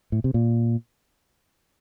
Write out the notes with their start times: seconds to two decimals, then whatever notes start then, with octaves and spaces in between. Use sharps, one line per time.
0.12 A2
0.24 C3
0.34 A#2